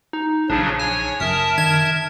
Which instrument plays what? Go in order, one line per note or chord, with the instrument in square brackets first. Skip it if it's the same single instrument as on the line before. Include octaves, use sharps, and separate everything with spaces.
[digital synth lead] D#4
[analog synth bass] A#1 [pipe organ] C#3 F3 F#3 [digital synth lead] D4
[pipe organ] C#5 [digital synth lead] G#5
[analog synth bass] F#1 [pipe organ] A#4 E5 A5 [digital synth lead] D#6
[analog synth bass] D#3 [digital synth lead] G#6